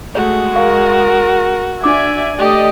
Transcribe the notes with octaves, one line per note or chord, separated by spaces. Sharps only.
G#3 A3 F#4 C#5
A#4 F5 C#6
D4 D5 E5 G#5 D6
A3 G4 D5 D#5